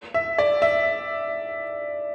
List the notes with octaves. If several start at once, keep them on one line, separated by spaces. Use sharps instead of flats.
E5
D5
E5